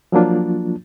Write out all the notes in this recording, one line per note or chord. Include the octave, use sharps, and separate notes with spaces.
F3 F#3 A#3 D4 F4